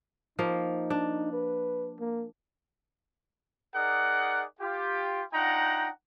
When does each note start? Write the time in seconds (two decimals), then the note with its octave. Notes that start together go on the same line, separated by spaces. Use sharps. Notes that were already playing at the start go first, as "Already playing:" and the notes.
0.39 F3 A#3 D#4
0.90 D4
1.33 B4
1.99 A#3
3.75 D#4 G#4 A#4 D5 F#5
4.61 F4 G4
5.33 D4 D#4 F4 F#5 G5 A#5